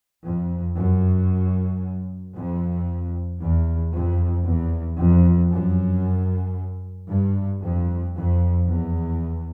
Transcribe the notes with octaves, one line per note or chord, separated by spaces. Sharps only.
F2
F#2
F2
E2
F2
E2
F2
F#2
G2
F2
F2
E2